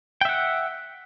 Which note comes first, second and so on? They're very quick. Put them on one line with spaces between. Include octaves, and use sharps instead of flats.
G5 E5 F#5